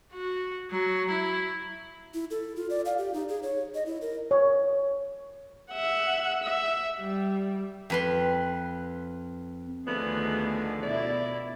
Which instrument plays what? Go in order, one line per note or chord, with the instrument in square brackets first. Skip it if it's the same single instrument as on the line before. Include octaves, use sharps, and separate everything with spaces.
[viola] F#4
F#3
E4
[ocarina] E4
A4
F4
D5
F5
G4
D#4
G#4
C#5
D#5
E4
A#4
[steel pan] C#5
[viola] E5 F#5
E5
G3
[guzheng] F2 B4 C6
[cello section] D2 D#3 G#4 [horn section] D3 F3 A3 [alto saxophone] B3
[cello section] B2 E4 [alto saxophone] D5